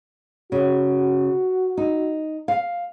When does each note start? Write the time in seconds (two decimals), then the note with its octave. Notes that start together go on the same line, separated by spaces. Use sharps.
0.52 C#3 F#4
1.77 D#4
2.48 F5